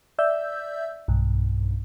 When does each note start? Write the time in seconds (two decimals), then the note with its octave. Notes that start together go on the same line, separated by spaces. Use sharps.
0.18 D5 E5 E6 G6
1.08 B1 G2